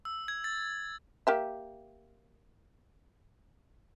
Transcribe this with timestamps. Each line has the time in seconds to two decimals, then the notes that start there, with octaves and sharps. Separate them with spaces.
0.05 E6
0.28 G#6
0.44 A6
1.27 A#3 G4 E5